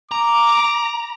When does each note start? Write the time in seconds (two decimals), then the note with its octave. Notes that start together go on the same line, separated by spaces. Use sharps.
0.11 A#5 D6